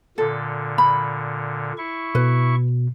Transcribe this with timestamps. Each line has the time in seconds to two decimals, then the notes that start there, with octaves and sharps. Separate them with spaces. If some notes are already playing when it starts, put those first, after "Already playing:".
0.18 A#2 D3 A4
0.78 B5
1.78 E4 C#6
2.15 B2 B4